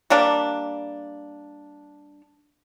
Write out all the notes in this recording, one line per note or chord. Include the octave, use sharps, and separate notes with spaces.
G3 A#3 D4